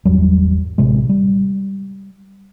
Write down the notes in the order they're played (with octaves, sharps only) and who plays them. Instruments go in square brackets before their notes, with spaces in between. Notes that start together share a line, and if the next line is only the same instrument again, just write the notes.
[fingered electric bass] G#1 E2 F#3 G3
A1 C3 G#3
G3